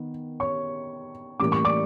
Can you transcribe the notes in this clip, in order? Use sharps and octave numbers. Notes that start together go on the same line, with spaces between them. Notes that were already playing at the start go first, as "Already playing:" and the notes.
Already playing: D#3 B3
C#5 C#6
A2 E3 G3 A#3 C#4 D6
C#6
D5 D6